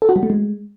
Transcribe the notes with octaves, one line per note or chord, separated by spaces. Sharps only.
A4
F#4
G3
A3
G#3